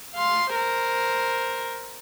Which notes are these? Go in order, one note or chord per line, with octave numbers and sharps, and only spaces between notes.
F5 C6
A#4 C5